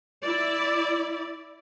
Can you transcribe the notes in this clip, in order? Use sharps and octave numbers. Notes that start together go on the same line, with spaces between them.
E4 D5